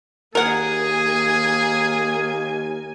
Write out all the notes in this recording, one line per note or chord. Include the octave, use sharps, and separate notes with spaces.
D#2 A#3 G#4 A#4 F#5 G#5